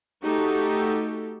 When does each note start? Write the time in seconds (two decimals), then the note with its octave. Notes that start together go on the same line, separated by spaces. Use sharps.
0.24 A3 D#4 F#4 G4 A4